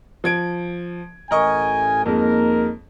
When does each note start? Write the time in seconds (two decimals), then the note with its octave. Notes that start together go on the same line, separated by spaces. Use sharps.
0.24 F3 G#6 D7
1.31 A1 A3 A#4 D#5 G#5 C#6
2.06 F2 G#3 A#3 D#4 A#4